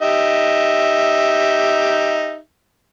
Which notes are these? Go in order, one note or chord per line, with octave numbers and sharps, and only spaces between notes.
D#4 G4 E5